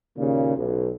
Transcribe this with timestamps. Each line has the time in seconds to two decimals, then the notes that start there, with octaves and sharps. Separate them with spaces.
0.18 D#2 A#2 C#3
0.57 B1